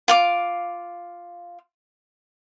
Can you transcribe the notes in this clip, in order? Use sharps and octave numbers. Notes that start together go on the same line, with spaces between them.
F4 F5 D6